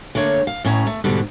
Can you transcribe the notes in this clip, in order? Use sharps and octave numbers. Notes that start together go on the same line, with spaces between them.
D3 A3 A#3 C#5
F5
A2 C#4 A#5
A3
G#2 B2 D3 G3